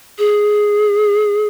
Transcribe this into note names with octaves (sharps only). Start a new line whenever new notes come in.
G#4